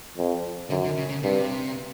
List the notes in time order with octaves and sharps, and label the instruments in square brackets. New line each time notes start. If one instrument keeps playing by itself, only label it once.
[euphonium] F2
[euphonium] F#2 [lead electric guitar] D3
[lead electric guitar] D3
C#3
C#3
[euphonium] G2 [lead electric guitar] C3